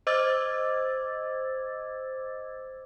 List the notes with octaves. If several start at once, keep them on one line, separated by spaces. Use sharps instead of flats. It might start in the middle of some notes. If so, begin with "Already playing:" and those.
C5 D#5 D6 E6 G#6 A6